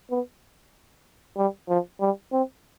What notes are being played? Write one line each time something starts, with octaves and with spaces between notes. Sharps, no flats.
B3
G3
F3
G3
C4